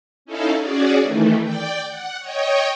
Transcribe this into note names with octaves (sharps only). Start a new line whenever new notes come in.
C#4 D#4 E4 A4 F5
C#4 F#4 G#4 D5
D#3 E3 A3
D5 G5
F#5
C#5 D#5 G5